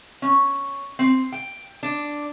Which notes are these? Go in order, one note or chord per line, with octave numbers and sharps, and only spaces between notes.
C#4
C4
G5
D4